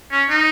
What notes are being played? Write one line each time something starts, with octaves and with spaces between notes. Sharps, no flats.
C#4
D#4